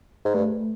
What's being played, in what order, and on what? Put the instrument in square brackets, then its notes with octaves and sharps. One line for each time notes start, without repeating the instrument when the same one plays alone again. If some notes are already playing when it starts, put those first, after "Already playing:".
[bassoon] G#2
[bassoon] G2 [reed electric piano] A3